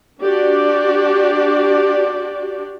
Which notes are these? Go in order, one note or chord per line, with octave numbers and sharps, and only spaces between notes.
D4 F#4 G4 D5